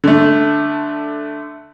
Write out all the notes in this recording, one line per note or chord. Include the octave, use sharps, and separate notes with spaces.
D3 A3